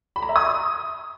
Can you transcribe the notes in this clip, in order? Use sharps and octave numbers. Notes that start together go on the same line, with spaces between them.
B5
A#5
E5
D#6